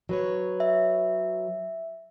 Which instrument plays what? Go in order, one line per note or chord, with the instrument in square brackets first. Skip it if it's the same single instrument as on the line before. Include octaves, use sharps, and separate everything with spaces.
[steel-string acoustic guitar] F#3 B4 C#5
[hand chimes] E5